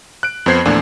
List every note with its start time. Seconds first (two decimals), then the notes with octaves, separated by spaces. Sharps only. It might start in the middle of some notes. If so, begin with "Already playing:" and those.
0.23 F#6 D7
0.46 F2 B3 C5 G#6 C7
0.65 E2 A#2 F3 A3 D4